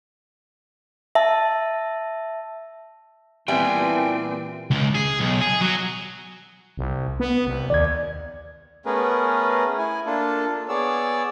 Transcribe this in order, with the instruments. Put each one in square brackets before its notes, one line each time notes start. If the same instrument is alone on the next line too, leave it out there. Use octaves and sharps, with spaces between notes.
[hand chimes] E5 A5
[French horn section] A#2 E3 [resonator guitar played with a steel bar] G3 B3 E5 [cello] C4 [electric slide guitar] G5 G#5
[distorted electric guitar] C#2
G#4
B1
G#4
F#3
[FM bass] C2
B3
C2
[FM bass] D#2 [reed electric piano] D5 G#6
[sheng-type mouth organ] A3 B3 C#4 G#4 A#4 B4
E4 G#5
A#3 D4 F4 A4
B3 G#4 C#5 D5 E6